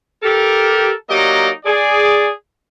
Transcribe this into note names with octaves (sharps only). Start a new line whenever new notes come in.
G4 A4 A#4
F#3 A#3 D#4 G4 D5 D#5
G#4 D5